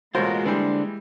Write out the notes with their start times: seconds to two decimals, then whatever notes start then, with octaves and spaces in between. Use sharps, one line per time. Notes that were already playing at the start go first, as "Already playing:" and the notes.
0.15 A1 B2 G#3 A#3 F4 F#4 A#4 C5
0.45 D3 E3 G3 D4 C5